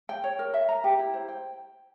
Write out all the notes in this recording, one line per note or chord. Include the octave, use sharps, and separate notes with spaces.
G5
C#5
A#4
E5
A#5
G4
E4
C5
G5